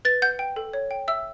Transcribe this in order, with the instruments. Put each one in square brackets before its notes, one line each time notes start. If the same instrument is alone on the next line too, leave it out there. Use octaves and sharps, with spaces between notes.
[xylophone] B4 A6
F#5 G6
G5
A4
C#5
G5
E5 E6